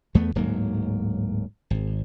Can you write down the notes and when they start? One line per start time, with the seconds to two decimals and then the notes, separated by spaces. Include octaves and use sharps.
0.15 E2 A3 B3
0.35 D1 G#2 F#3 A#3
1.70 G#1